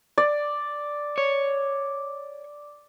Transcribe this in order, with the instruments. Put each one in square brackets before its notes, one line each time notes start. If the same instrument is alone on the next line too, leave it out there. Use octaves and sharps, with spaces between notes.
[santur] D5
[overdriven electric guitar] C#5